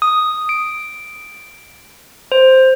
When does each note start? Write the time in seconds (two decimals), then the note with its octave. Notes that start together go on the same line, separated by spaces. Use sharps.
0.02 D#6
0.49 D7
2.32 C5